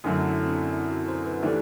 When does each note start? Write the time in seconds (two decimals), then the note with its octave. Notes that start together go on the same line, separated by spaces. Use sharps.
0.04 F#2 D3 F#3 A3 E4
0.27 E4
0.43 C4
0.50 D4
0.73 E4
0.91 F#4
1.08 C5
1.26 B4
1.42 E3 A3 D4 G4 A4